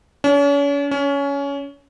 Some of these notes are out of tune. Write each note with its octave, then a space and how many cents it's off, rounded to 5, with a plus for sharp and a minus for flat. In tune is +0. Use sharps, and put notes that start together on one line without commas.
C#4 +40
C#4 +20